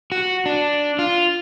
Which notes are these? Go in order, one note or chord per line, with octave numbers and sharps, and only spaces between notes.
F#4
D4
F4